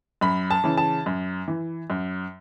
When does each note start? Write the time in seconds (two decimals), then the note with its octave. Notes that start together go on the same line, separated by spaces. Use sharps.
0.21 F#2 B5
0.51 A5
0.64 C#3 E3
0.77 A5
1.06 F#2
1.48 E3
1.90 F#2